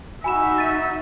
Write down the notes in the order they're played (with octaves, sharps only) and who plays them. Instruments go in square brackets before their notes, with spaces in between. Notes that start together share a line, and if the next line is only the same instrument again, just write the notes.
[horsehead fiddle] D#4 E5 [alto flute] F#4 [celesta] G#5 B5 E7
[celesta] A6 D#7